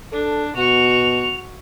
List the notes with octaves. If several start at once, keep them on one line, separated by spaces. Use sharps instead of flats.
D4 A4
B2 F#4 C#6 F7